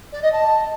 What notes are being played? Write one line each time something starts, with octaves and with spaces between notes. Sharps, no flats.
D5
D#5
A5